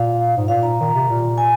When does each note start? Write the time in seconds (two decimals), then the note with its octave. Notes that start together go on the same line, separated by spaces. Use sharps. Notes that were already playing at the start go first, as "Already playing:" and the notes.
Already playing: A#2 F5
0.37 G#2
0.48 A#2 F5
0.63 A#5
0.80 D#3
0.94 C3
1.09 A#2
1.38 G#5